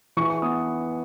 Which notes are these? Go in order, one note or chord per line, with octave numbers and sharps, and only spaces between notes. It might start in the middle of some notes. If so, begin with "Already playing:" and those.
E3 C#6
C#6
B3 D#6